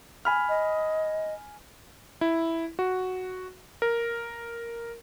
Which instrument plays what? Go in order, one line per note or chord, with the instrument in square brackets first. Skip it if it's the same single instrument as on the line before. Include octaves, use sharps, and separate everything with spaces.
[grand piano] G#5 B5 F6
[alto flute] D#5
[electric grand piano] E4
F#4
A#4